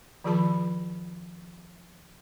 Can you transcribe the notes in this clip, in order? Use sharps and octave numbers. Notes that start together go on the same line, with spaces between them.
D#3 F3 F4 G#4 A5 B5